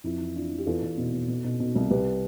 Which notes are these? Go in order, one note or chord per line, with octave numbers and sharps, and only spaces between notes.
F2 E4
E3
E3 D4 F4
E3
G4
E2 F4 A4
E2
B2
B2
B2
B2
B2
C2
C2 G4 B4